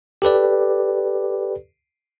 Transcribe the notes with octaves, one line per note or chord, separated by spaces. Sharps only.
G4 A4 B4 D5